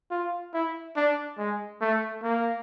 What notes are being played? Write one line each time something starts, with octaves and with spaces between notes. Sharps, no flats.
F4
E4
D4
G#3
A3
A#3